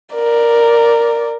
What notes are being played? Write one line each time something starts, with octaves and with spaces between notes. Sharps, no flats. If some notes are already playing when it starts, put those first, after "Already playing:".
A#4 D5